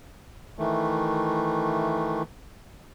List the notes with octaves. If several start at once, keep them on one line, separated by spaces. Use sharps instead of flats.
D#3 E3 A3